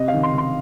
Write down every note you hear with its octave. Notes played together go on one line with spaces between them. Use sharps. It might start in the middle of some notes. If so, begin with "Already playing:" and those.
Already playing: C3 D#5
F5
D#3
C6
D#3 C6